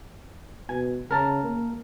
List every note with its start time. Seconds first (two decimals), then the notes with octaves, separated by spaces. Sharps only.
0.69 B2 G#5
1.11 C#3 A#4 A5 A#5
1.43 A#3